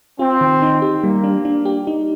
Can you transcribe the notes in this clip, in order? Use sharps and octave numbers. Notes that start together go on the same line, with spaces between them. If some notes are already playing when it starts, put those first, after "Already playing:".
C4 F4
D#3
D#4
G4
G3 A#3
D4
D4
G4
D#4